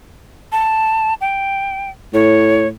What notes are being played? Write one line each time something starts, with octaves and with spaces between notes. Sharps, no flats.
A5
G5
A2 C#5